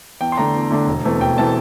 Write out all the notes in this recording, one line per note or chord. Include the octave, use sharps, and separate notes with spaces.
E2 G5
C6
D3 A3 D4 A#5
E2
D3 A3 D4
E1
E2 E3 A3 C4
E1 G5
E3 A3 C4 A5